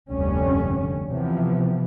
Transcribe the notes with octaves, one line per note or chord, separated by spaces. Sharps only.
F1 D2 G2 D3 G3 C#4
C3 E3 F3 B3